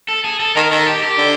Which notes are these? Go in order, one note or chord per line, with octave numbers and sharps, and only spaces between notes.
A4
G#4
A4
D#3 A#4
D#3 A4
G4
G4
D3